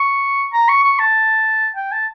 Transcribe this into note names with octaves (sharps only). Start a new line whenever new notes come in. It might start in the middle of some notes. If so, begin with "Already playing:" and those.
Already playing: C#6
A#5
C#6
C#6
A5
G5
A5